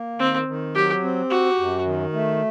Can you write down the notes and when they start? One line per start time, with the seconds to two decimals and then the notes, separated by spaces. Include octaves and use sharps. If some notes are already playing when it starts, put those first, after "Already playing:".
Already playing: A#3
0.19 D#3 C4
0.48 D#3
0.75 F#3 G4
1.03 C4
1.30 F#4 G4
1.59 F#2
1.85 D#3
2.13 A3